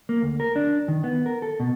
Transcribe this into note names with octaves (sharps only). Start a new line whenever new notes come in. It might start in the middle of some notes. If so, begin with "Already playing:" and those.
A#3
D2
A#4
D4
D#3
B3
A#4
A4
B2